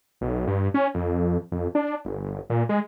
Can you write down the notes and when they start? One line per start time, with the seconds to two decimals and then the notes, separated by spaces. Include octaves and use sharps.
0.21 B1
0.47 G2
0.74 C#4
0.94 F2
1.52 F2
1.75 D4
2.05 G1
2.50 A#2
2.69 G#3